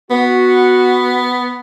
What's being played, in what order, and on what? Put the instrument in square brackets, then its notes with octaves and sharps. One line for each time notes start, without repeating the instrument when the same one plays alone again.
[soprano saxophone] B3 [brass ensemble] F#4